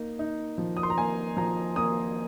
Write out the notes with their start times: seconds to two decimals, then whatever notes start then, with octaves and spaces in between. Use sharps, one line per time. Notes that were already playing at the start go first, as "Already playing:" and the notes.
Already playing: A#3 D#4
0.19 D#4
0.58 F3
0.77 D#6
0.83 C6
0.90 A#5
0.98 A#3 G#5
1.37 F3 A#5
1.76 A#3 D#6